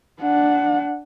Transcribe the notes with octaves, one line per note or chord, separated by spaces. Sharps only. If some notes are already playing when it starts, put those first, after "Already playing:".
D4 F#5